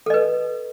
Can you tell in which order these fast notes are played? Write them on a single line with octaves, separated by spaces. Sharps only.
A4 D#5 B4